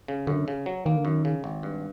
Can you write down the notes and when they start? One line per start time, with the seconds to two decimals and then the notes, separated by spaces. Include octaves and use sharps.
0.08 C#3
0.27 F#2 D3
0.48 C#3
0.66 F#3
0.86 D#3 A#3
0.96 D3
1.05 F#2 D#3
1.25 C#3
1.44 G#1
1.63 G2